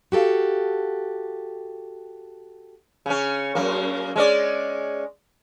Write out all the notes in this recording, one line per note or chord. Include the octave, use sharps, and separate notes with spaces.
F#4 G4 A4 F5
C#3 C#4
F#2 A#3
G#3 C#4 D5